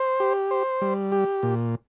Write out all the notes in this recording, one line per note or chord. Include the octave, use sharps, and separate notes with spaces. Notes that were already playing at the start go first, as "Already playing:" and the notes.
Already playing: C5
G4
C5
G3
G4
A#2